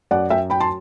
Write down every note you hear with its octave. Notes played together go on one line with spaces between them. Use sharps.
F#2 D5 F#5
F#2 E5 G5
F#3 G5 B5
A5 C6